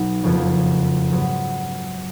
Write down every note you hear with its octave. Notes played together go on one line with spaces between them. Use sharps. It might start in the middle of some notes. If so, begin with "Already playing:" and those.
Already playing: B1 B2 F#3 B3 D#4
F#1 F2 C#3 F3 B3
G#2 F#3 B3